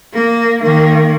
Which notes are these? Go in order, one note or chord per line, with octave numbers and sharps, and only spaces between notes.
A#3
D#3 A#3